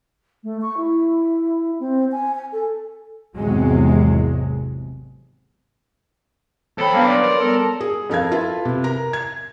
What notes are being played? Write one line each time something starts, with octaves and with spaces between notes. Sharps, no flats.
A3
C#6
E4
C4
G#5
G#5
A4
G#1 E2 C3 F#3 G#3
E2 A4 C5 C#5 G5 B5
F#3 A#3 B3 D4 B4
C#5 D5 C6
A#4
G3 B3 A4
G#4
F2 A4 A#4 F5 G#6
F4 A4 B4 E5
C3
A#4 A#5
G#6